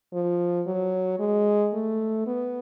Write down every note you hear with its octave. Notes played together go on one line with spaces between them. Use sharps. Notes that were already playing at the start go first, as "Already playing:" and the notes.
F3
F#3
G#3
A3
B3